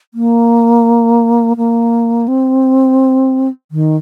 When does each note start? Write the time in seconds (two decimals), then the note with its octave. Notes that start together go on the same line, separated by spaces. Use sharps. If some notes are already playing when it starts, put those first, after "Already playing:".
0.14 A#3
1.57 A#3
2.28 C4
3.71 D#3